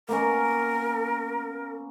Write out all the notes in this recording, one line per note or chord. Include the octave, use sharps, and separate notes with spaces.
A#3 B3 C#4 A#4